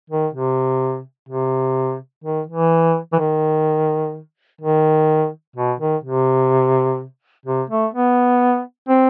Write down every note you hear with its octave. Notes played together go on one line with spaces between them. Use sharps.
D#3
C3
C3
D#3
E3
E3
D#3
D#3
B2
D#3
C3
C3
A3
B3
C4